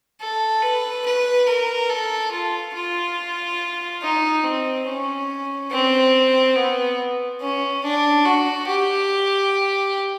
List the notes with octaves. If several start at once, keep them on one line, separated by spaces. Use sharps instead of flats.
A4
B4
B4
A#4
A4
F4
F4
D#4
C4
C#4
C4
B3
C#4
D4
F#4
G4